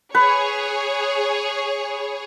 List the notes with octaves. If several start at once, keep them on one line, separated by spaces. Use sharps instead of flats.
G#4 B4 C#5